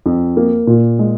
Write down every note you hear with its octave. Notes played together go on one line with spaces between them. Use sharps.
F2
A#3
A#2
G#3